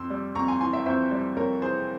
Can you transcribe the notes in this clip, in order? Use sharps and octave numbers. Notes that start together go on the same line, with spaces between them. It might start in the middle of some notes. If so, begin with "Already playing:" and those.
Already playing: F2 C6 E6
G3
F2 A#5 C#6
G#5 C6
E3 G#5 C6
E5 G5
F2 C5 E5
G3
F2 A#4 C#5
E3 G#4 C5